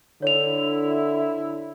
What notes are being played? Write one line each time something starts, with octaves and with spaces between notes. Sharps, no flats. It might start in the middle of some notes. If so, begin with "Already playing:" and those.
D3 E4 C#5 F7